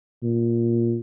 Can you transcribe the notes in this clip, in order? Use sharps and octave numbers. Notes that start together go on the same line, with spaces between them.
A#2